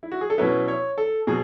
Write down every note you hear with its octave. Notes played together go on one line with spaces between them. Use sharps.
E4
F#4
G#4
A4
B2 F#3 C#4 E4 B4
C#5
A4
B2 F#3 G#4